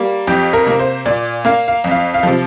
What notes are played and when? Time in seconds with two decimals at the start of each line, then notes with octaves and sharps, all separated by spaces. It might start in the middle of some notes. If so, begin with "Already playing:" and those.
Already playing: G3 A#3
0.27 F2 G4
0.53 A#4
0.66 C3 A#3
0.79 C5
1.06 A#2 D5
1.45 A#3 F5
1.68 F5
1.84 F2
1.91 F5
2.14 F5
2.23 C3 F3